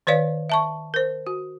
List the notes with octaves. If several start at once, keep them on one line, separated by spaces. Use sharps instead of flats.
D#3 B4 C#5 D5 F5
E5 A5 C#6
A#4 C5
F#4